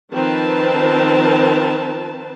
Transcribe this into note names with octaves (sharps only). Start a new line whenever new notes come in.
D#3 F3 C4 A#4 B4 A5